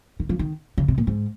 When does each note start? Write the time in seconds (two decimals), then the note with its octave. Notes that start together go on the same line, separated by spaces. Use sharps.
0.20 D#3
0.29 F3
0.39 D#3
0.78 C#3
0.88 C3
0.98 A#2
1.07 G#2